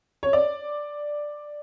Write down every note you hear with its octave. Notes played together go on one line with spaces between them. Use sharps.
C#5
D5